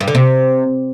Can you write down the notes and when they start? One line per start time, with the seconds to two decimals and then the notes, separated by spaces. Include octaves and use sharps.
0.01 G2
0.08 D3
0.15 C3